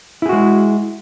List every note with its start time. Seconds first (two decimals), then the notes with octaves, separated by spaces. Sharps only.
0.22 E4
0.26 G#4
0.29 F#4
0.33 G#3